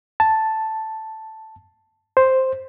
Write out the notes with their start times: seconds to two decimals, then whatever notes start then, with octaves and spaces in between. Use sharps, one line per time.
0.20 A5
2.17 C5